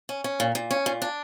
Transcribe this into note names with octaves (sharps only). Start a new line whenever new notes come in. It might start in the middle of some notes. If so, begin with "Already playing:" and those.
C#4
C#4
A#2
A#2
C#4
A#2
D4